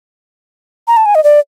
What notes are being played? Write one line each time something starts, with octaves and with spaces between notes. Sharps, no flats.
A#5
A5
G#5
D#5
D5